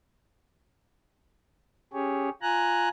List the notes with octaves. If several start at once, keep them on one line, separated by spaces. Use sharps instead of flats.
C#4 G4 G#4 C#5
F4 G#5 A#5 F#6